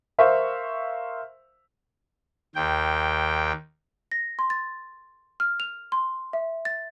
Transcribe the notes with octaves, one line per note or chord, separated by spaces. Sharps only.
A#4 C5 E5 F5 C#6
D#2 G5
A#6
C6
A6
F6
F7
C6
E5
A6